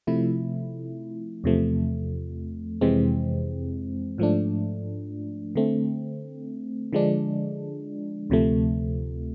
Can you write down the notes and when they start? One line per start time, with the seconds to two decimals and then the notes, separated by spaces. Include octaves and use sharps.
0.07 C3 F3 A3 E4
1.44 E2 C3 F3 A3
2.81 F2 C3 E3 G#3 C4
4.18 G#2 F3 A3 D4
5.55 D3 A3 C4
6.93 D3 F3 G#3 D4
8.30 D2 C3 F3 A3